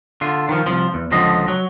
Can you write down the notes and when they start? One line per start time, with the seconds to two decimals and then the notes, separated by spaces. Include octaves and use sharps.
0.21 D3 F4
0.49 D#3 F3
0.66 C2 F3
0.94 E2
1.12 C#2 D3 F3 D#5
1.48 F#3